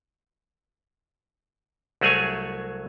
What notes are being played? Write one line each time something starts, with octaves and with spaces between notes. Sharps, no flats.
C2 F#3 A3 G#4 C#5 G#5